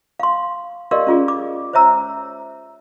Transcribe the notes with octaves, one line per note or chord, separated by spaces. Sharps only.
F5 C6
G4 A#4 D5 D#5 F5 C6
C#4 F4 G#4 D5
D6
C5 C#5 E5 A#5 E6